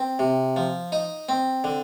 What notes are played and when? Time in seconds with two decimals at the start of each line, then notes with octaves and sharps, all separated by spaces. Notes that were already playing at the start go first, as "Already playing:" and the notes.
Already playing: C4
0.19 C3
0.56 F3
0.92 D#4
1.29 C4
1.64 D3